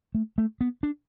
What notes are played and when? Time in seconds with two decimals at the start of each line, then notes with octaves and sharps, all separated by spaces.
0.15 A3
0.38 A3
0.61 B3
0.83 D4